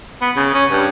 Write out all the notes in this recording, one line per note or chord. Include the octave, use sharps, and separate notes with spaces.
B3
C#3
C#4
G2